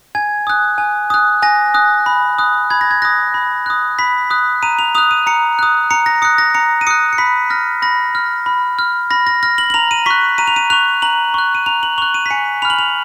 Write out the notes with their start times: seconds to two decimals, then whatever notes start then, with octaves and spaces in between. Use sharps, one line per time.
0.15 G#5 G#6
0.47 D#6 F#6
0.78 G#5
1.10 D#6 F#6
1.42 G#5 A#6
1.74 D#6 F#6
2.06 B5
2.38 D#6 F#6
2.70 B5 G#6
2.81 A#6
2.91 G#6
3.02 D#6 F#6 A#6
3.34 B5
3.66 D#6 F#6
3.99 B5 B6
4.30 D#6 F#6
4.63 A#5 D#7
4.79 F7
4.95 D#6 F#6 F7
5.11 D#7
5.27 A#5 C#7
5.59 D#6 F#6
5.91 A#5 C#7
6.06 A#6
6.22 D#6 F#6 C#7
6.38 A#6
6.55 A#5 C#7
6.81 D#7
6.87 D#6 F#6 C#7
7.13 C#7
7.18 B5 B6
7.50 F6 A#6
7.82 B5 A#6
8.15 F6
8.46 B5
8.79 F6
9.11 B5 A#6
9.27 A#6
9.43 F6 A#6
9.58 F#7
9.70 F#7
9.74 A#5 F7
9.91 D#7
10.06 C#6 F#6 B6
10.38 A#5 D#7
10.47 F7
10.56 D#7
10.70 C#6 F#6 F7
11.02 A#5 F#7
11.34 C#6 F#6
11.55 D#7
11.66 A#5 F7
11.83 F#7
11.98 C#6 F#6 F7
12.14 D#7
12.26 B6
12.30 G#5 C#7
12.62 B5 F6 F7
12.70 F#7
12.79 F7